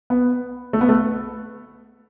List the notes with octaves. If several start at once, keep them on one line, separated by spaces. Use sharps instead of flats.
B3
A3
B3
A3